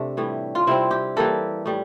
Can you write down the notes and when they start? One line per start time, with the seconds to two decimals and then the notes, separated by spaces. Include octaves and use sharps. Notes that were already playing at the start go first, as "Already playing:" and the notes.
Already playing: C3 A3 D4
0.17 A2 E3 G3
0.55 F4
0.67 C3 G3 C4 E4
0.91 G4
1.16 E3 G3 A#3 A4
1.66 A2 G3